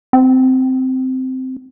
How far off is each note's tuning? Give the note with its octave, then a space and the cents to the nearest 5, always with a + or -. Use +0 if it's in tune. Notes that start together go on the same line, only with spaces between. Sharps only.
C4 -10